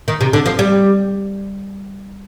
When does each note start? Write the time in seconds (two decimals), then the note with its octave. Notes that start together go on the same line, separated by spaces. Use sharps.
0.08 D#3
0.21 C3
0.33 D3
0.46 F3
0.59 G3